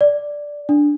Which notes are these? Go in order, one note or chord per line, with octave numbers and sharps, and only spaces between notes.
D5
D4